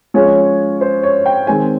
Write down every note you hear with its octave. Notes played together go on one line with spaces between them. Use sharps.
F3 G#3 C#4 C#5
C5
C#5
G5
D#3 G#3 C4 G#5